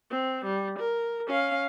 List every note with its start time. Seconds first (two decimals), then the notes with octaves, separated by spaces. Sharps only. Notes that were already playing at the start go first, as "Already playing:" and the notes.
0.11 C4
0.45 G3
0.79 A#4
1.27 C#4 F5